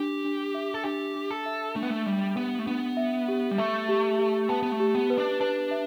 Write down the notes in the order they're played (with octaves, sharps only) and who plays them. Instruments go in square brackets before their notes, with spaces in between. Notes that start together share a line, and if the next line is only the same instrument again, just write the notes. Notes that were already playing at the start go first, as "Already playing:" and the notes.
Already playing: [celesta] D4 [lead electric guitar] G4
[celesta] D4
E5
[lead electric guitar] A4
[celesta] D4 [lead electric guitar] G4
[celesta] D4
[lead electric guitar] A4
[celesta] E5
[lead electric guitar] A3 [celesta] D4
[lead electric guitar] B3
A3
[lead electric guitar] G3 [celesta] E5
[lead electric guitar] B3 [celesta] G4
[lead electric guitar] A3
[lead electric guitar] B3 [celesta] D4
[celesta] E5
G4
[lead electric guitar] G3
[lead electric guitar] A3 [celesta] E5
[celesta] G4
G4
[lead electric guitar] B3 [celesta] A5
[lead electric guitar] B3
A3
[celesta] G4
[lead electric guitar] B3
[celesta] B4
[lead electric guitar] D4
[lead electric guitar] D4 [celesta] B4
[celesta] E5